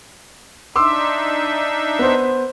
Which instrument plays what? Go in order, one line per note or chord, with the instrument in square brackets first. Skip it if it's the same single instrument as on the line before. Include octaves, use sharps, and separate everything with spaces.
[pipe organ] D4 D#4 E5 [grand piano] C6 D6 E6
[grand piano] B3 C5